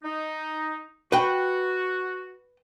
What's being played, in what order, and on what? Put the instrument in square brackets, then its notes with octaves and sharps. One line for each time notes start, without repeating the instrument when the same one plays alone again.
[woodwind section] D#4
[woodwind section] F#4 [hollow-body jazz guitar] B4 G5